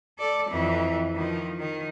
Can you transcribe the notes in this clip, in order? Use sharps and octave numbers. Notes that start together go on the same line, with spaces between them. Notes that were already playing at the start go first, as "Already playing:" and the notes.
A4 D5
F2 E3
D#3 F3
D#3